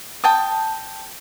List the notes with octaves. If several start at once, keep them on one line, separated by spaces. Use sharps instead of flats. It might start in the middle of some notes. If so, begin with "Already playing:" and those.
G5 A5 D#6